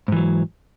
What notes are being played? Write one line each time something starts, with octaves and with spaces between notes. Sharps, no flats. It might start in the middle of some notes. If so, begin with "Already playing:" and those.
G#2 E3 F#3